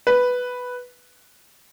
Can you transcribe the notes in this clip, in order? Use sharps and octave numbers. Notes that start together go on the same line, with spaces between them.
B4